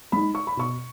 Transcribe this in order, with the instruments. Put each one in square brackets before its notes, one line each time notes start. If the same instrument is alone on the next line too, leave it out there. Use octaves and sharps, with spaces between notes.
[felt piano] G#3 D#4 B5
C#6
B5
B2 C#6